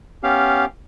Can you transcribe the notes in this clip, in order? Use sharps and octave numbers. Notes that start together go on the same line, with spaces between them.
B3 C#4 G4 F5